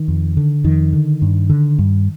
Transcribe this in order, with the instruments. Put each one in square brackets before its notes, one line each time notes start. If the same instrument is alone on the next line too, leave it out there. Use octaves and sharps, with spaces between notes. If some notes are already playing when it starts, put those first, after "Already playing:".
Already playing: [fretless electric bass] D#3
F2
D3
F2 D#3
D3
G2
D3
G2